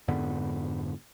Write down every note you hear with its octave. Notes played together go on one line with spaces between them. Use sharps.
F2 G#2 D3 B3